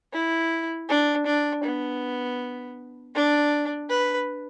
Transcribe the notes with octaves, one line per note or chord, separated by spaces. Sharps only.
E4
D4
D4
B3
D4
B4